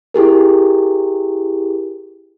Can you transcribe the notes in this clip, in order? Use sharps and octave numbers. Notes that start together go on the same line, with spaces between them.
E4 G4 G#4 A#4